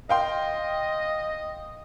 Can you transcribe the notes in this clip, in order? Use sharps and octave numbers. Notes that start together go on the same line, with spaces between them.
D#5 F5 G5 C6